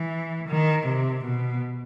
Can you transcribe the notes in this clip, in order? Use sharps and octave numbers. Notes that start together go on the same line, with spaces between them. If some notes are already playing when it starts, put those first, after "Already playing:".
Already playing: E3
D#3
C3
B2